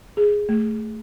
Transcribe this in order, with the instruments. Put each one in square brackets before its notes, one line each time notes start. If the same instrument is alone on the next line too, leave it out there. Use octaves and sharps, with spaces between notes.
[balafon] G#4
A3